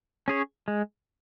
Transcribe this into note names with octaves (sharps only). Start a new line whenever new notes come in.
C#4 G#4 C#5
G#3